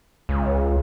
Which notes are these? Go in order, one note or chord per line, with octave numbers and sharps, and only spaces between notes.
C#2